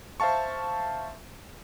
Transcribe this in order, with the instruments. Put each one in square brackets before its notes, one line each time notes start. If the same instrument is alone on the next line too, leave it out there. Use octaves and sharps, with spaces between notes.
[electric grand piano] C5 E5 F5 A5 C#6